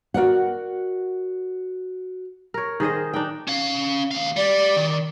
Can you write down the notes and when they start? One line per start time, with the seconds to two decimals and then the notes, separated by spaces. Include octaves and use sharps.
0.14 F#4 A#4 D5 F#5
2.54 A#4 C#5
2.80 D#3 G#4 C5 D#5
3.14 D4 D#4 G5
3.48 C#4 F5
4.11 D#2 F5
4.36 G3 D5
4.77 D#3